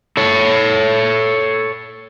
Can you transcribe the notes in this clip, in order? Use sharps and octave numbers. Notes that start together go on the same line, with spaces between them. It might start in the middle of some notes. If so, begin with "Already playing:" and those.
A4 C#5